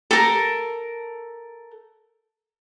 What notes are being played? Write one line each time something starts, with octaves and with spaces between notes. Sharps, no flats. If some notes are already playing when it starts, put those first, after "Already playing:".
A4 A#4